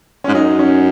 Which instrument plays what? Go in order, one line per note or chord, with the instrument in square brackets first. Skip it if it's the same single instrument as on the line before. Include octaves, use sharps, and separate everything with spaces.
[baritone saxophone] G#2 [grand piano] C#4
[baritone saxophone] F#2 [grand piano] D#4
[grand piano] C#4